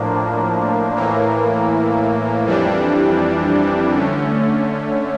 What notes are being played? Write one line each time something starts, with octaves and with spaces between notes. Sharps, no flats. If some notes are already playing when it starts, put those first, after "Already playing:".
Already playing: A2 F3 A#3 D4
A2 E3 A#3
F2 E3 G3 D4
D3 A3 C#4